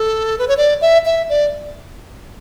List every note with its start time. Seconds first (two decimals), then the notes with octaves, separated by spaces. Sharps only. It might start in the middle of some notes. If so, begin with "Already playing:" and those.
Already playing: A4
0.39 B4
0.48 C#5
0.57 D5
0.81 E5
1.05 E5
1.29 D5